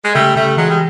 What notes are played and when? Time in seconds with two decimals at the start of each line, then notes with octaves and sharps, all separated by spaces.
0.04 G#3
0.14 C#3 G3 A3
0.36 C#3 G3 A3
0.57 E3 F#3 G#3
0.70 G3